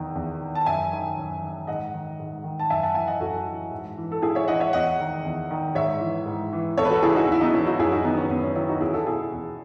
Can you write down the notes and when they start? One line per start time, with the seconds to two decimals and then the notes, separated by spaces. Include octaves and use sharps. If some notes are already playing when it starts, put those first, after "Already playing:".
Already playing: E2 D#3
0.15 E2
0.40 D#3
0.55 A5
0.66 F#2 E5 G#5
0.91 D#3
1.17 F#2
1.42 D#3
1.67 G#2 D#5 F#5
1.94 D#3
2.20 G#2
2.44 D#3
2.59 A5
2.70 F#2 E5 G#5
2.83 F#5 A5
2.95 E3 E5 G#5
3.07 D#5 F#5
3.20 F#2 F#4 A4
3.47 E3
3.71 G#2
3.98 E3
4.12 A4
4.22 G#2 E4 G#4
4.35 C#5 E5
4.48 E3 D#5 F#5
4.60 C#5 E5
4.73 E2 D#5 F#5
5.00 D#3
5.25 E2
5.51 D#3
5.75 G#2 C#5 E5
6.00 E3
6.26 G#2
6.53 E3
6.78 E2 A4 C#5
6.85 B4
6.90 F#4 A4
7.02 C#3 E3 E4 G#4
7.15 D#4 F#4
7.28 E2 E4
7.41 B3 D#4
7.53 C#3 E3 C#4 E4
7.67 D#4 F#4
7.79 F#2 E4 G#4
7.92 D#4 F#4
8.04 D#3 B3 D#4
8.17 C#4
8.30 F#2 B3
8.43 C#4
8.55 D#3 C#4 E4
8.69 D#4 F#4
8.81 E2 E4 G#4
8.94 F#4 A4
9.07 B2 E4 G#4
9.32 E2